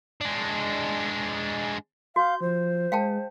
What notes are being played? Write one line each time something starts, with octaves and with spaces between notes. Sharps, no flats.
G#3 D4
F#4 F5 G6
F3 C5
G#3 F5 G5 A5